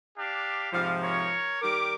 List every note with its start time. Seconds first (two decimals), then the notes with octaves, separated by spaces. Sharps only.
0.18 D4 G4 F5
0.72 G#2 C3 F3 G3 F5
1.02 A#4 C#5
1.61 D#3 G3 G4 A#4 D6